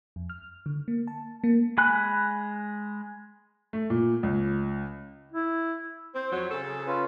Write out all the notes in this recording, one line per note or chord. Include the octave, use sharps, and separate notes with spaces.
F2
F6
D3
A#3
A5
A#3
G#3 G#5 B5 F#6
A3
A#2
C#2
E4
C4 C5
F2 F#3
C#3 A4
G#4
C#4 F4 B4